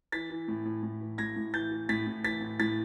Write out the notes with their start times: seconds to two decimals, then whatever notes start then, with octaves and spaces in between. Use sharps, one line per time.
0.12 E3 A6 B6
0.30 E3
0.48 A2
0.65 A2
0.83 A2
1.01 E3
1.18 A2 G#6 A#6
1.36 A2
1.54 E3 G6 A6
1.71 E3
1.89 A2 A6 B6
2.07 A2
2.24 E3 A6 B6
2.41 A2
2.59 A2 A6 B6